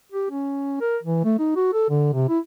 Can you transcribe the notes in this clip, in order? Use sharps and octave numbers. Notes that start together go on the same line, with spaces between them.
G4
C#4
A#4
E3
A3
D#4
F#4
A4
D3
C3
E4